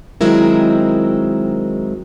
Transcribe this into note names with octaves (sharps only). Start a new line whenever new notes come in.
D#3 F#3 G#3 C4 E4 A#4